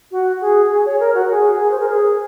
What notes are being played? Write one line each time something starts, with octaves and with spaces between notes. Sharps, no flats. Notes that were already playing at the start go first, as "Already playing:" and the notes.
F#4
G#4
G#4
C#5
A#4
F#4
G#4
G#4
C5
A#4
G#4